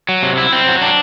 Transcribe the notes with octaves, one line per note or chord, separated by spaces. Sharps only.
F#3
C3
E4
C4
F#3
D4